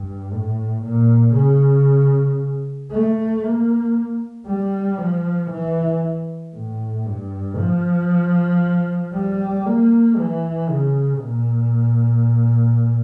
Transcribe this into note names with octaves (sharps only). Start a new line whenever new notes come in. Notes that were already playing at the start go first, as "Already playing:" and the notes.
Already playing: G2
A2
A#2
C#3
A3
A#3
G3
F3
E3
A2
G2
F3
G3
A#3
E3
C#3
A#2